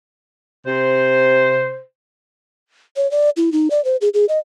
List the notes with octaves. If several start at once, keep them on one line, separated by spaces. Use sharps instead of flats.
C3 C5
C#5
D5
E4
D#4
D5
C5
G#4
G#4
D#5